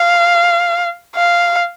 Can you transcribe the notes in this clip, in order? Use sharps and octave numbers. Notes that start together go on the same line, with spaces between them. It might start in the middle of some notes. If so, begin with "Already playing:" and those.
Already playing: F5
F5